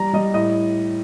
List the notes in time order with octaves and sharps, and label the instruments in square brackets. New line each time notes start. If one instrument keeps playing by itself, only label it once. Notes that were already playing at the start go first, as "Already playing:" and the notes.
Already playing: [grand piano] G3 A#5
G3 D#5
A2 D#5